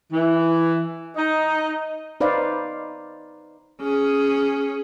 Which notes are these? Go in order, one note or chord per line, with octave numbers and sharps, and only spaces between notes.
E3
D#4
D#4 B4 C5 D5 F5
C#4 G#4